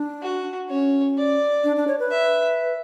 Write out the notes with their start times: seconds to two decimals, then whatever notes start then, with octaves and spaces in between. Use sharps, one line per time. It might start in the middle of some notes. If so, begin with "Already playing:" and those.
Already playing: D4
0.22 F#4
0.69 C#4 C#5
1.17 D5
1.64 D4
1.76 D4
1.88 C#5
2.00 B4
2.11 E5